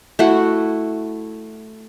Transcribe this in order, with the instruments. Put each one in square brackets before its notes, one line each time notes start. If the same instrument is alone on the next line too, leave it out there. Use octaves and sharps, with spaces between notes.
[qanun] A3 E4 F#4